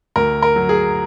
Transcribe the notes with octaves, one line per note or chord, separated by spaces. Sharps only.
D2 A#4
A#4
F#3
G#4